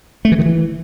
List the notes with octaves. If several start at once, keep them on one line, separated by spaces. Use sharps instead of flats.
A3
E3
D#3
E3